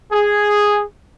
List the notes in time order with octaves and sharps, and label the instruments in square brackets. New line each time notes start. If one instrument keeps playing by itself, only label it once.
[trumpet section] G#4